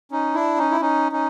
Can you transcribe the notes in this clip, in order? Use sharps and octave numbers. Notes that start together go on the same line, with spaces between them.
C#4 D#4
D4 E4
C#4 D#4
E4
C#4 D#4
C#4 D#4